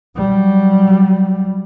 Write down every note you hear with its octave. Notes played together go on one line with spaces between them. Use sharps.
F#3 G3